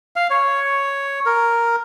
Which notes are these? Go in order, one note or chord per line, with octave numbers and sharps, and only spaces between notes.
F5
C#5
A#4